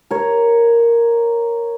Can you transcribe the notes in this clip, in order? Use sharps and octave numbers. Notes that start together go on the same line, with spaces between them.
A#4 C#5